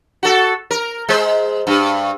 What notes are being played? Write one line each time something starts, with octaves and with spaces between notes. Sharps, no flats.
F#4 A4
A#4
G#3 C5
G2